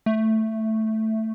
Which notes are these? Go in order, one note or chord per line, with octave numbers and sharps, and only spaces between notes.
A3